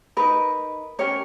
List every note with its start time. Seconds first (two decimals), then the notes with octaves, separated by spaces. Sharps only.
0.17 D#4 A#4 B4
0.99 C#4 G4 A#4 C#5